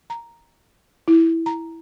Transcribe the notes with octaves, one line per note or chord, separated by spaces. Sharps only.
A#5
E4
A#5